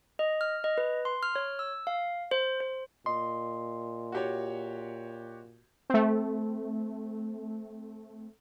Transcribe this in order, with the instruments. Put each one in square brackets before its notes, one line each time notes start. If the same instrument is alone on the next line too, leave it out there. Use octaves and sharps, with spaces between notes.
[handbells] D#5
F6
D#5
B4
C6
F6
C#5
E6
F5
C5
C5
[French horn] A#2 [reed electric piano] D#5 C6
[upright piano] F#4 G4 C#5
[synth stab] A3 C4